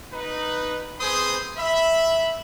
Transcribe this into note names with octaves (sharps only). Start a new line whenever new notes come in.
D#4 B4
C4 G#4 B4 C5 C6 D#6
E5 B5